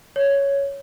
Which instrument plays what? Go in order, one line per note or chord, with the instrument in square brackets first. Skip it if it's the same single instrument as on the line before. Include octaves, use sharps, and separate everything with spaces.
[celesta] C#5